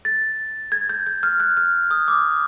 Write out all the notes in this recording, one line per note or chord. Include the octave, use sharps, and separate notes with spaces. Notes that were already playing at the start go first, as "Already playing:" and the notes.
A6
G#6
G6
G6
F6
F#6
F6
D#6
D6